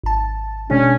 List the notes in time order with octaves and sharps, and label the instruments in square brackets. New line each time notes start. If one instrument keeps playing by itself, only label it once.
[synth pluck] G#1 A5
[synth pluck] B2 G#3 D4 [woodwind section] C#4